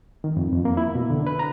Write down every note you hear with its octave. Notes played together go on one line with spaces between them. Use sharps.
D#3
F2
F2
A#3
E4
B2
D3
B4
A#5